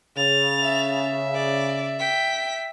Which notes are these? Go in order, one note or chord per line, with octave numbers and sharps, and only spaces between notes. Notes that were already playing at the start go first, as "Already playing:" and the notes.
C#3 A6 F7
E5
D5
G5 B6